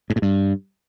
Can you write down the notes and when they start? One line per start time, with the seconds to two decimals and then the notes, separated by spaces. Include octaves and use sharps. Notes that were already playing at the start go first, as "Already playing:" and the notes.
0.10 G#2
0.16 A2
0.22 G2